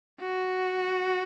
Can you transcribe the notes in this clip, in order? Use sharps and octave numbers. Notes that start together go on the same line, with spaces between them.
F#4